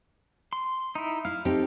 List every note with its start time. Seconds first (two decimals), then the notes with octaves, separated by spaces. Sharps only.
0.53 C6
0.95 D#4 E4
1.25 E4 F5
1.45 C4 D#4 G4 A4